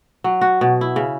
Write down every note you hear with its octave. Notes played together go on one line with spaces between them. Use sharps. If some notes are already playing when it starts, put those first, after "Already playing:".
F#3
F#4
B2
E4
C#3